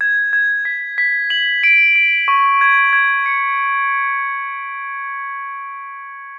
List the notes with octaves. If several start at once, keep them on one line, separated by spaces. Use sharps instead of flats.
G#6
G#6
B6
B6
F#7
D7
D7
C#6
G#6
G#6
C#7